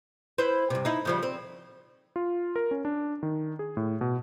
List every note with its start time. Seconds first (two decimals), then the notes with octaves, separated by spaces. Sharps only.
0.38 E4 B4 C5
0.70 G2 C3
0.85 D#4 E4
1.05 C#3 F3 G3
1.23 C4
2.16 F4
2.56 A#4
2.71 C#4
2.85 D4
3.23 D#3
3.59 G#4
3.77 A2
4.01 B2